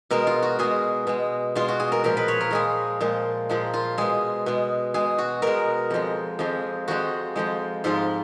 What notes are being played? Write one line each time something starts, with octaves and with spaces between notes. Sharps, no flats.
B2 G#3 A#4
F4
F#4
B2 G#3 G#4
B2 G#3
B2 G#3 F4
F#4
G#4
A#4
A#2 F3 G#3 A#4
B4
C#5
A#4
A#2 F3 G#3 G#4
A#2 F3 G#3
A#2 F3 G#3
F4
B2 G#3 G#4
B2 G#3
B2 G#3 G#4
F#4
B2 G#3 A#4
F2 F3 G#3
F2 F3 G#3
F2 F3 G#3 F#4
F2 F3 G#3
G#2 F3 G#3 F4